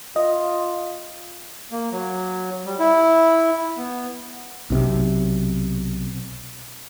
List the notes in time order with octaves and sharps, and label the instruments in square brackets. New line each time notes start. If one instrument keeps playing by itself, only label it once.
[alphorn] F4 [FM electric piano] D#5
[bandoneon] A#3
F#3
G3
E4
B3
[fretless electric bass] B1 C3